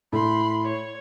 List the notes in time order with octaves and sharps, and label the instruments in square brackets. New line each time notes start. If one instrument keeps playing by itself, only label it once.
[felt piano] A2 [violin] B5 C6
[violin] C#5